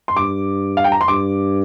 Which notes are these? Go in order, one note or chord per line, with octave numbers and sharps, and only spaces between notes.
C6
G2 D6
F5
G5
A#5
C6
G2 D6